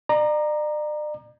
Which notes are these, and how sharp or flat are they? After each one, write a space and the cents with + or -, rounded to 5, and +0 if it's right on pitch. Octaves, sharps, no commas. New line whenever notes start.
D5 +40 A#5 +0